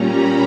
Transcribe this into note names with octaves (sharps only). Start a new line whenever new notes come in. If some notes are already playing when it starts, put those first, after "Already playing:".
Already playing: A#2 G3 C#4 A#5
B5